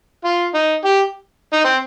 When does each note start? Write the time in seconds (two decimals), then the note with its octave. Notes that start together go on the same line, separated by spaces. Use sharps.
0.24 F4
0.54 D#4
0.85 G4
1.53 D#4
1.64 C4